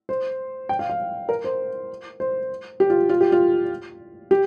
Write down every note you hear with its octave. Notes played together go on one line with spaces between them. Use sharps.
C5
G5
F5
F5
A#4
C5
C5
G4
F4
F4
G4
F4
G4